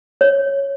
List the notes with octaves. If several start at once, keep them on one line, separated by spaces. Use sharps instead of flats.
C#5